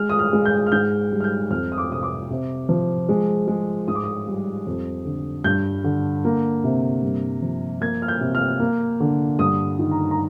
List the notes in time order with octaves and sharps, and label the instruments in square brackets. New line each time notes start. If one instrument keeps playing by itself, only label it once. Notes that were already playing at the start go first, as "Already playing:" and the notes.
Already playing: [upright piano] G#3 F6
D#6
F6
G#3
G6
F6
G#2 G6
G3
F6
G6
F2 F6
D#6
D6
C3 D#6
D6
C3
F3
G#3
G#3
G#2 D#6
D6
D#6
G3
F2
D3
G2 G6
D3
A#3
C3
G2
F3
A#3 G#6
F6
G6
C3
F6
A#3
D3
G2 D#6
D#3
A#5
A#5